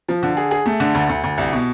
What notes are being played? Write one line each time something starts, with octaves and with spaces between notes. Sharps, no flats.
F3
D3
G#4
G#4
A3
D3
D2
D2
D2
C2
B2